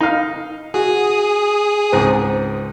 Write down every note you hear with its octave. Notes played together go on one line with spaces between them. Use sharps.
D#4 F5
F#4 G#4 D#6
C#2 G#2 C4